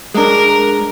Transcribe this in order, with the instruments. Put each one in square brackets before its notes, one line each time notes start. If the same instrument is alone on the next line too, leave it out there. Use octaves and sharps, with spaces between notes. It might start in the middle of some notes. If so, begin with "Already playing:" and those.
[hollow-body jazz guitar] G#3 D4 [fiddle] A#4